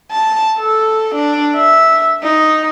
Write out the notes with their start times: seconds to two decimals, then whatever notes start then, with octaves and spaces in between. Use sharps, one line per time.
0.11 A5
0.59 A4
1.15 D4
1.56 E5
2.23 D#4